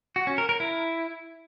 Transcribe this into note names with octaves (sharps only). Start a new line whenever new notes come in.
F#4
C#4
A#4
A#4
E4